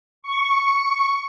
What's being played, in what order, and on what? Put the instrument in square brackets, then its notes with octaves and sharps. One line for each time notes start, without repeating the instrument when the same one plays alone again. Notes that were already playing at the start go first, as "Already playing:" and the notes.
[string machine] C#6